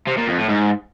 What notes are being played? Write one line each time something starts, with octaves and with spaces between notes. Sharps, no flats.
C3
A#2
F2
A2
G#2